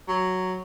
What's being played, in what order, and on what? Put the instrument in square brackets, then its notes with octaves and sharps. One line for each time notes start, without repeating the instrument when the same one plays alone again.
[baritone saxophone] F#3